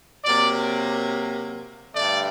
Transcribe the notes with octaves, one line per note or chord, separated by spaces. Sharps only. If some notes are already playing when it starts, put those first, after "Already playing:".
C3 F#3 A#3 D5
G2 D3 A3 D5